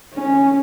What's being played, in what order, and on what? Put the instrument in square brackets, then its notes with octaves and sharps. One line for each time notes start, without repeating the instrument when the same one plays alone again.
[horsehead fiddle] C#4